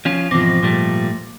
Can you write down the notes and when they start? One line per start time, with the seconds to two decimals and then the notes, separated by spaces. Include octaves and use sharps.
0.05 F3 C#4 F4
0.31 G#2 B2 E3 F3 C4 D6 A#6
0.63 A#2 G3 A3